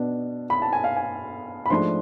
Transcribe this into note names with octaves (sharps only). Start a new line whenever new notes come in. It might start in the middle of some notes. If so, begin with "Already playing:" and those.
Already playing: B2 B3 D4
B5
A5
G#5
F5
G#5
B5
G#2 F3 A3 D4 C6